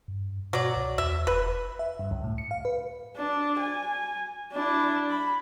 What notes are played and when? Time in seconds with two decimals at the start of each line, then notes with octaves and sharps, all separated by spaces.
0.08 G2
0.53 B2 F#3 D5
0.76 C#2
0.98 E2 E5
1.27 F1 B4
1.79 E5
1.99 G2
2.11 C#2
2.24 A2
2.38 C#7
2.51 F5
2.65 B4
3.17 D4
3.60 G#5
4.53 D4 E4
5.10 B5